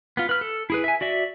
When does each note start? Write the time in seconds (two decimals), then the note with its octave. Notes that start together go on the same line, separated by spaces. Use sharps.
0.17 B3 F4
0.29 B4 F6
0.41 A4
0.70 E4 G#4 B4
0.84 E5 G#5
1.01 F#4 D5 E5